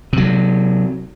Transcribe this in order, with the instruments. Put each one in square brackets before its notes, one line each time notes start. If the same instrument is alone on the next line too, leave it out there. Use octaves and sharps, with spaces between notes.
[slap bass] C3 F#3